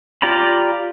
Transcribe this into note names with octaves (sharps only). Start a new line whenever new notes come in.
F4 G4 D5 A#5 B5